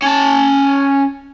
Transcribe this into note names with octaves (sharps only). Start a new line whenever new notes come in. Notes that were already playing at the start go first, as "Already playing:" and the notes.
C#4 A5